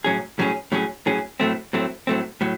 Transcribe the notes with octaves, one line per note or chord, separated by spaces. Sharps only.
A2 F#3 C#4 G#4
A2 F#3 C#4 G#4
A2 F#3 C#4 G#4
A2 F#3 C#4 G#4
A2 F#3 A3 C4
A2 F#3 A3 C4
A2 F#3 A3 C4
A2 F#3